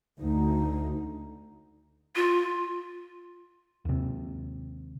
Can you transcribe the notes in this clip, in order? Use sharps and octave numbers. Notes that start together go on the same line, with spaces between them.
D2 D#4
F4
D#2 C3